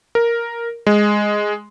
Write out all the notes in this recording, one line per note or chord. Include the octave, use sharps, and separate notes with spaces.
A#4
G#3